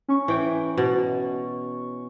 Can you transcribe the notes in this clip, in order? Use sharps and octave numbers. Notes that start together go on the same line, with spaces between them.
C#4 C#6
E3 G5
B2